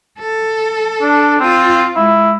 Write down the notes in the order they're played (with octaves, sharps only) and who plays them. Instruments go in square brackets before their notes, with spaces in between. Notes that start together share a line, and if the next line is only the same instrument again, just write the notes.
[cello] A4
[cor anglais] D4
[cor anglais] C4 [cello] F4
[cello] G#3 [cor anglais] E4